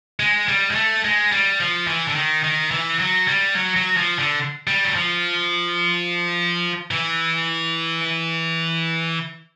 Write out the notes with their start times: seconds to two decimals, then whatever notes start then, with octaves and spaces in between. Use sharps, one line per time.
0.20 G#3
0.48 G3
0.71 G#3
0.75 A3
1.04 G#3
1.32 G3
1.60 F3
1.87 E3
2.08 D3
2.15 D#3
2.44 D#3
2.71 E3
3.00 F#3
3.27 G3
3.55 F#3
3.76 F#3
3.97 F3
4.19 D3
4.67 G3
4.85 F#3
4.95 F3
6.91 E3